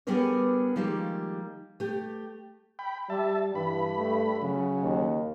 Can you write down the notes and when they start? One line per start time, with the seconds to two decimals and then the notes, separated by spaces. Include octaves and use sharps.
0.07 G3 B3 D4 G#4 A#4 C#5
0.76 D#3 F3 G3 G#3 A#3
1.80 A3 G4
2.79 G5 B5
3.10 G3 E5 A5
3.55 G2 E3 B5
3.98 A3
4.42 C#3 F#3
4.82 D#2